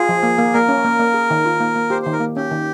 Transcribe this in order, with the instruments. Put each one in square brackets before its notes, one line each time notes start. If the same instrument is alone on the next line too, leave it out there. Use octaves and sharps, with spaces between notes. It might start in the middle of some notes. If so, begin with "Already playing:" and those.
Already playing: [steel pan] F4 [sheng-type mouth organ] G#4
[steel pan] F3
A#3
A#3
[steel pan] A#3 [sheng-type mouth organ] A#4
[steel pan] C#4
A#3
A#3
G#4
D#3
F4
A#3
A#3
[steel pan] G4 [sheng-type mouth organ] C5
[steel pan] D#3 [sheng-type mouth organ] C5
[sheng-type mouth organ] A#4
[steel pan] A#3
[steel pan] C#4 [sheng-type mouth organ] G4
[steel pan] D#3